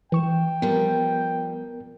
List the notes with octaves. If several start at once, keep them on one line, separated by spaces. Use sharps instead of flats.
E3 G5 C#6 E7
F3 G3 B3 A#4